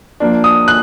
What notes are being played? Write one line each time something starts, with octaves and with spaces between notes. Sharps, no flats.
F3 A#3 D4
D#6
F#6